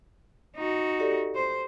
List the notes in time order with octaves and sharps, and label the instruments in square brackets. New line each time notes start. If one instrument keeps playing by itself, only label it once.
[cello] D#4 F#4
[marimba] G4 A4 D5
[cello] C5